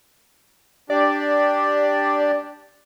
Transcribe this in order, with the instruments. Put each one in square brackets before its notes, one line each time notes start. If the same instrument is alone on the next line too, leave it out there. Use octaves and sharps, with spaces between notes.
[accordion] D4 G4 [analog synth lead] D5